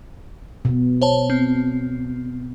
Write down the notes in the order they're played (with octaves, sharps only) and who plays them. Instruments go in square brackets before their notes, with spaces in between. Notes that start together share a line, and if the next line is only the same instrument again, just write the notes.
[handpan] B2
[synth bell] C5 C#5 A5
C4